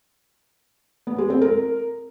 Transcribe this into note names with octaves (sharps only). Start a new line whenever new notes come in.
B3
G#3
C4
A#4